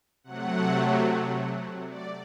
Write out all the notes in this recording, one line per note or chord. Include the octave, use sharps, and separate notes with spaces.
C3 F#3 A3 F#5
D5